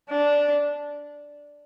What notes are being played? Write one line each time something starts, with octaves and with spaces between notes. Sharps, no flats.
D4